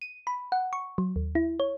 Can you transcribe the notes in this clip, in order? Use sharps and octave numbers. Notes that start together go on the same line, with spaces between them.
D#7
B5
F#5
C#6
F#3
D#2
E4
C#5